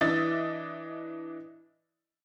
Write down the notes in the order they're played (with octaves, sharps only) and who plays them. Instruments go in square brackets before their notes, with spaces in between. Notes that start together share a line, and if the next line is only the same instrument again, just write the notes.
[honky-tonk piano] E3 D4 D#5 E5 A6